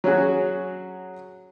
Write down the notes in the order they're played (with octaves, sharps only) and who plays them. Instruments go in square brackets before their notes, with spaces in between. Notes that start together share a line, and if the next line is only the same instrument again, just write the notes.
[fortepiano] F#3 C#4 F#4 G#4